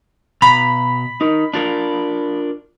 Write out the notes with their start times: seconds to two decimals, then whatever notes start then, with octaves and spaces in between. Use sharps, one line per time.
0.42 B2 A#5 B5
1.21 D#4 A#4
1.54 D4 F4 A#4